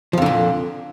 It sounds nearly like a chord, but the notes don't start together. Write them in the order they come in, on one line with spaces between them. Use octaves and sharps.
F3 F2 D3 A#2